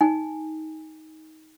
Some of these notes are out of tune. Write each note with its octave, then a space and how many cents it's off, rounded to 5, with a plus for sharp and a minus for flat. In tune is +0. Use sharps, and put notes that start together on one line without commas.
D#4 +15 G#5 -20